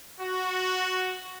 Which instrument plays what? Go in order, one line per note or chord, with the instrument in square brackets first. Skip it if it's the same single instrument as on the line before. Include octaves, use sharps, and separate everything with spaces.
[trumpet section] F#4